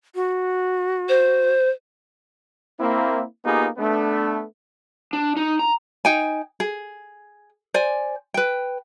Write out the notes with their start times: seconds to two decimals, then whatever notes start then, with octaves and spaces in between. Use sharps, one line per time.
0.15 F#4
1.09 C5
2.79 A#3 C4 E4
3.43 A#3 B3 D#4 F4 G4 G#4
3.77 A3 B3 D4
5.13 D4
5.37 D#4
5.59 A#5
6.05 D#4 G5 G#5
6.60 G#4
7.74 C5 D5 G#5
8.34 B4 G5